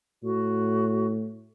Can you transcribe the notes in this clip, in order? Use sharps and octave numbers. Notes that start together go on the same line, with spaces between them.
A2 F#4